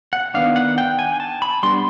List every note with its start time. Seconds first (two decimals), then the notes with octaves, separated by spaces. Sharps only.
0.13 F#5
0.34 D#3 G3 B3 D4 F5
0.56 F#5
0.78 G5
0.99 G#5
1.20 A5
1.42 B5
1.63 G3 B3 D4 C6